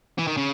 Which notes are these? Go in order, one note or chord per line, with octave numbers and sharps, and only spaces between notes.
E3
D#3
C#3